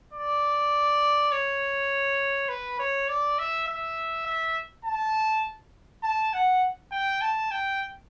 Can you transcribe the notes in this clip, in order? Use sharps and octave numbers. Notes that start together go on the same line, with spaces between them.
D5
C#5
B4
C#5
D5
E5
E5
E5
A5
A5
F#5
G5
A5
G5